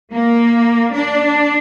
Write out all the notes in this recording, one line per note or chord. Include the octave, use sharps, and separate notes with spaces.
A#3
D4